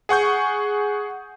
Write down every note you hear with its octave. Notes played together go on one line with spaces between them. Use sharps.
G#4 F#5 C#6 G6